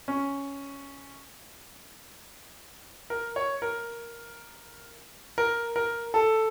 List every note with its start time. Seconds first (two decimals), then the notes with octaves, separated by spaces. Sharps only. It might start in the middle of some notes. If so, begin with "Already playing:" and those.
0.08 C#4
3.10 A#4
3.36 C#5
3.62 A#4
5.38 A#4
5.76 A#4
6.14 A4